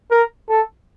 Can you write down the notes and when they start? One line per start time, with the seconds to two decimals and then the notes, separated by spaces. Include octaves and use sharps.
0.11 A#4
0.49 A4